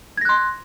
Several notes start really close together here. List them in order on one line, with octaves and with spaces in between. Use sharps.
G#6 A#6 F#6 C6